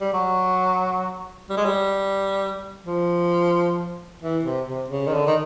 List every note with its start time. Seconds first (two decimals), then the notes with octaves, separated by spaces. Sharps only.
0.01 G3
0.14 F#3
1.50 G3
1.57 G#3
1.65 G3
2.86 F3
4.23 E3
4.45 C3
4.68 C3
4.90 C#3
5.07 D#3
5.13 D3
5.27 D#3